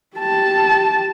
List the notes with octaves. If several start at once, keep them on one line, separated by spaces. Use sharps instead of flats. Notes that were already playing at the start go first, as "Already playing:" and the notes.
G4 A5